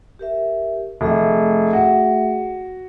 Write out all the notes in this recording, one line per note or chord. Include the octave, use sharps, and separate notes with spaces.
G4 A#4 E5
F1 A3 G#4 E5
F#4